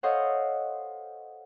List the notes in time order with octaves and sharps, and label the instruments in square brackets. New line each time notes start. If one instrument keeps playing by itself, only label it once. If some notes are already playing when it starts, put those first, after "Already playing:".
[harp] A4 C5 C#5 D#5 F5 F#5